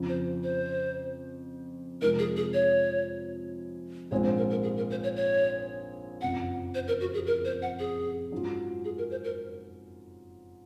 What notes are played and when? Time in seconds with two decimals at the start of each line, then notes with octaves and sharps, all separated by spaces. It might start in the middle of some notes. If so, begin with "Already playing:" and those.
Already playing: F2 C#3 F3
0.09 C5
0.43 C5
2.02 F2 C3 F3 G#3 D#4 A#4
2.19 G#4
2.36 G#4
2.54 C#5
4.11 A#1 G#2 F3 G#3 C4 C#5
4.25 C5
4.38 A#4
4.50 A#4
4.63 G#4
4.77 A#4
4.91 C5
5.03 C#5
5.16 C#5
6.22 F#1 F2 C#3 F3 F#5
6.75 C5
6.88 A#4
7.01 F#4
7.14 G#4
7.27 A#4
7.45 C5
7.62 F#5
7.79 G#4
8.32 G#2 F#3 C#4 F4
8.85 G#4
8.98 A#4
9.11 C5
9.24 A#4